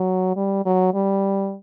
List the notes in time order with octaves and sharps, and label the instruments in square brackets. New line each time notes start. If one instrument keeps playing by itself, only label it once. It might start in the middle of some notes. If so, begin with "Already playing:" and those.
Already playing: [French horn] F#3
G3
F#3
G3